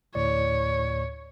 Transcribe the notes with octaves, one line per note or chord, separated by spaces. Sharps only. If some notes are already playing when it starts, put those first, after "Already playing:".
D2 A2 C#5 D5